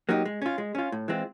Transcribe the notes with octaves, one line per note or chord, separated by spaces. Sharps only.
F#3 A#3 D#4 G4
G#3
C#4 F4
G#3
C#4 F4
A2
E3 G#3 C4 F4